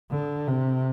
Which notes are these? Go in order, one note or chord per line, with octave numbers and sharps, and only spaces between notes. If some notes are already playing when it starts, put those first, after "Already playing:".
D3
C3